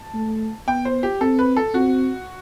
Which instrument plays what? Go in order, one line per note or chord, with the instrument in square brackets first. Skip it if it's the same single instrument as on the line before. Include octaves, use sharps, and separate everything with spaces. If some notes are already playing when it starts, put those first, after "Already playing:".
Already playing: [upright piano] A5
[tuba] A3
[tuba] B3 [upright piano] G5
[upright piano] C5
G4
[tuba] C4 [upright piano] A4
[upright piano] B4
A4
[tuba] C4 [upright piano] F#4